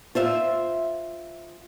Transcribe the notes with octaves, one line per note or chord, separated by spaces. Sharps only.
F4 C5 E5